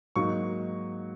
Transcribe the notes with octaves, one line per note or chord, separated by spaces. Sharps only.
G#2 F#3 A#3 D#4 C#6